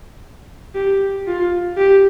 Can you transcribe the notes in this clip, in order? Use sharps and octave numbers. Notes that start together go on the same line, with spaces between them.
G4
F4
G4